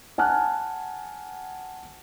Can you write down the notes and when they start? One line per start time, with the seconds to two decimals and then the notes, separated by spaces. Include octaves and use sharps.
0.18 F#5 G#5 A5 F6 F#6